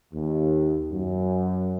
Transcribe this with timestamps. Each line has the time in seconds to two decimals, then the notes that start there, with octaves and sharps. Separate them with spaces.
0.14 D#2
0.92 F#2